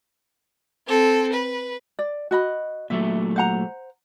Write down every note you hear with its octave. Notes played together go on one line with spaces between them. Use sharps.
C4 A4
B4
D5
F#4 D#5 B5
A#2 F#3 A3 E5
C5 F#5 A#5